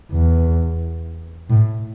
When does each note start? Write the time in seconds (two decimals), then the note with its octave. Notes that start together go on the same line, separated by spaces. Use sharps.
0.12 E2
1.50 A2